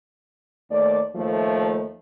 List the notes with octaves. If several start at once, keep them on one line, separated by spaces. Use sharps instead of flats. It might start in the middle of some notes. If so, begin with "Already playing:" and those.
D#2 A3 D5
D#2 F3 A3